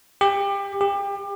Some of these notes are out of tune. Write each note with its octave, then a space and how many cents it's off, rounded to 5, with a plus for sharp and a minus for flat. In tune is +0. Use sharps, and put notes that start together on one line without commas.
G4 +25
G4 +30